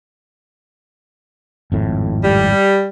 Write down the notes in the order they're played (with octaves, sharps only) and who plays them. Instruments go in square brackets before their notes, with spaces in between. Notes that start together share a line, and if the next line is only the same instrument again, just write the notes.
[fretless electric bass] G#1 F2 A2
[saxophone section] G3